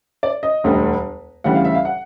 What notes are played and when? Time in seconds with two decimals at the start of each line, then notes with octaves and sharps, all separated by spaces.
0.23 D5
0.43 D#5
0.64 E1 D2 D3 G3
1.44 D2 C#3 E3 G3 F#5
1.55 F5
1.65 E5
1.75 F5
1.85 F#5